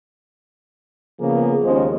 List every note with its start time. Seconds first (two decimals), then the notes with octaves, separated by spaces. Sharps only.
1.19 C#3 F3 A#3 B3 G#4
1.63 D#2 F3 G#3 C#4 C5